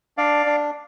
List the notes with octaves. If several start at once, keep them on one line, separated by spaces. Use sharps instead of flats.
D4 D5 F5
D4